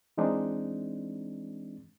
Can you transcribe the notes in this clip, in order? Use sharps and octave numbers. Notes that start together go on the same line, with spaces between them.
E3 G#3 C4 D4 D#4